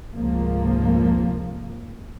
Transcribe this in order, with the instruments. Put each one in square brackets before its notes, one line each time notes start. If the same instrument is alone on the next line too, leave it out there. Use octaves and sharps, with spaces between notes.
[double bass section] F1 C#2 G#2 F3 A#3